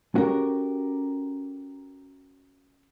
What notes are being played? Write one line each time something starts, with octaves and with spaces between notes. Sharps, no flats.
C#4 F#4 G4 A4 A#4